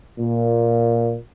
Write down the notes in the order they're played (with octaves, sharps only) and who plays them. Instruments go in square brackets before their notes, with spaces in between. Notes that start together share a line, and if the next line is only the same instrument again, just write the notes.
[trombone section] A#2